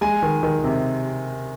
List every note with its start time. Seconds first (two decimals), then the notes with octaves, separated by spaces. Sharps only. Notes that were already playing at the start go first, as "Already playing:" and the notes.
0.01 G#3 G#5
0.22 D#3
0.43 D#3
0.64 C3